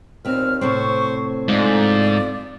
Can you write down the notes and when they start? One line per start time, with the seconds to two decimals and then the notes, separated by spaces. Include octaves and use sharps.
0.25 D#2 A#2 C4 B4 F6
0.61 A2 C3 C4 C5 C#6
1.48 G#2 F4 A4 D5